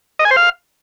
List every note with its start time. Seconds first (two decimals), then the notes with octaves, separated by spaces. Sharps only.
0.19 D#5
0.25 G#5
0.31 C5
0.36 F5